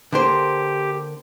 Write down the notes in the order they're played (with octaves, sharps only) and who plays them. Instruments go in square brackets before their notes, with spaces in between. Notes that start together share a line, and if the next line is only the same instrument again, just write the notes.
[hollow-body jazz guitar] D3 A#3 C5 [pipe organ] G4